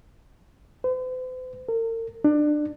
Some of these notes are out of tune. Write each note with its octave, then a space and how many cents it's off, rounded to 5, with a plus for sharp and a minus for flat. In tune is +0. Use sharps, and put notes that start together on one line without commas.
C5 -45
A#4 -40
D4 +25